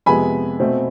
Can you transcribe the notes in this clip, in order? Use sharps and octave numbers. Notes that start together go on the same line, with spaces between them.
F2 C3 G#3 B3 G#5 B5
B2 A3 C4